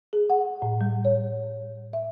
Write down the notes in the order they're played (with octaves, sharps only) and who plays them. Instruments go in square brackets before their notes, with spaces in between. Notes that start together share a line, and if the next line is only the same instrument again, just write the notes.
[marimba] G#4
F#5
A2
G3
C#5
E5